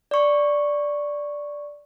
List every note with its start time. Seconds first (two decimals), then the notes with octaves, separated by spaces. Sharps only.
0.11 D5 C#6